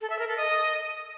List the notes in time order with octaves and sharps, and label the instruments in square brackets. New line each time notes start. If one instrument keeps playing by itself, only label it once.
[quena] A4
E5
A#4
A4
D#5